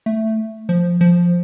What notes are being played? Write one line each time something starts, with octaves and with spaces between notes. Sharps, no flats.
A3
F3
F3